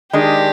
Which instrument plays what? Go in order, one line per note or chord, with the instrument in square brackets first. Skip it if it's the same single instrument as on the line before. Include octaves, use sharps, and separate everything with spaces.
[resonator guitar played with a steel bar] D#3 G#3 D4 [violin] G4